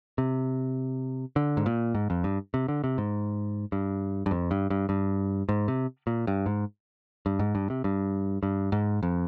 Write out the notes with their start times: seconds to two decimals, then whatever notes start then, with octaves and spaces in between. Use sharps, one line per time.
0.18 C3
1.36 D3
1.57 G#2
1.66 A#2
1.94 G#2
2.10 F2
2.24 G2
2.54 C3
2.68 D3
2.84 C3
2.98 G#2
3.72 G2
4.26 G2
4.31 F2
4.51 G2
4.70 G2
4.89 G2
5.49 G#2
5.68 C3
6.07 A#2
6.27 G2
6.46 G#2
7.26 G2
7.39 G#2
7.55 G2
7.70 C3
7.84 G2
8.43 G2
8.72 G#2
9.03 F2